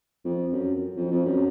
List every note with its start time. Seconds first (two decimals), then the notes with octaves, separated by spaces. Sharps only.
0.25 F2
0.53 F#2
0.97 F2
1.11 F2
1.25 F#2